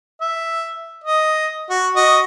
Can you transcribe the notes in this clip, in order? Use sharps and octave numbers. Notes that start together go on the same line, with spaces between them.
E5
D#5
F#4
F#4 D#5